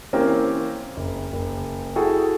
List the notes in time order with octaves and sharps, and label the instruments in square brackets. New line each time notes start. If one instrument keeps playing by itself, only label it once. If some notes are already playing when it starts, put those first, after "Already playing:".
[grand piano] E3 A#3 C4 C#4 G4 A#4
F#1
F#1
E4 F#4 G#4 A4 G5